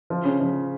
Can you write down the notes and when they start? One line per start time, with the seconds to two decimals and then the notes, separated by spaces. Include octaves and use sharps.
0.10 F3
0.25 C#3
0.40 F3